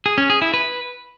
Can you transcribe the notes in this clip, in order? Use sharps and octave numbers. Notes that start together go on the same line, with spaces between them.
G#4
C#4
G#4
E4
B4